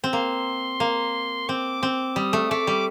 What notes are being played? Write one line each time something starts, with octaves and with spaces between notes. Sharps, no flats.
C4
A#3 C6
A#3
C4 D6
C4
G3 D#6
A3
A3 D6
G3